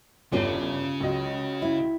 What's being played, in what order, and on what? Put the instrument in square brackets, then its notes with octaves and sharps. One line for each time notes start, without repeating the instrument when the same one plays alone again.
[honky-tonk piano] G1 E2 [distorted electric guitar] C#3 [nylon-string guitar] C#4 F4 G4
[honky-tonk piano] C#2 F#3 D#5
[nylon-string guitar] E4